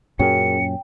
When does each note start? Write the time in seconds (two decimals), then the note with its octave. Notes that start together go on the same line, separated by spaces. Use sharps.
0.19 F#2 A#2 C#4 F#4 G#4 A#4 G5 C#7